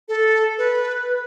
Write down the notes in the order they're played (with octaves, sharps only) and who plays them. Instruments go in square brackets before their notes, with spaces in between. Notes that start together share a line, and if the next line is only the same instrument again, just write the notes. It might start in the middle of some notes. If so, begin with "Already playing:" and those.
[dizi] A4
B4